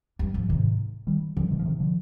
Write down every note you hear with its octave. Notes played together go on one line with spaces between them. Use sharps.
G2
G3
G#2
F3
G#2 C3 D#3
D#3 G3
G2 D3 F3
C3 D#3
F3
C3 D#3
D3 F3